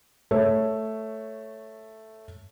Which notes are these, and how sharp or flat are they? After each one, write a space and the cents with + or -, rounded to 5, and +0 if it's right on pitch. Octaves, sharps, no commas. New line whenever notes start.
A3 +0 C#5 +0